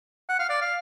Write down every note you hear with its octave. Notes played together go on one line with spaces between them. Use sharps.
F#5
F5
D5
F5